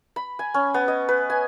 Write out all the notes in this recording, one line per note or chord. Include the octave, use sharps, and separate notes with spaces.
B5
G#5
C#4
B3
D#5
B4
G#5